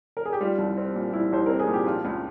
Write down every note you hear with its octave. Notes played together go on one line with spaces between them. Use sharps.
A#4
G#4
G4
G3 F4
C2
C4
A#2
G3 E4
C2 C5
C4 A#4
G#4
A#2
G4
F3 F4
C#2